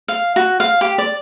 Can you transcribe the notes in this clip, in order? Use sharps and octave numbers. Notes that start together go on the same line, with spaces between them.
F5
F#4
F5
G4
D5